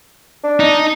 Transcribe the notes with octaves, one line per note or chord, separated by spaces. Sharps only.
D4
D#4